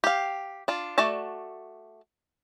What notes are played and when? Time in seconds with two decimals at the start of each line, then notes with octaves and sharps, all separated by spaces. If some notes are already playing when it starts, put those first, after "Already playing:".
0.04 G4 F5
0.68 D4 F4
0.98 A3 F#4 D5 A5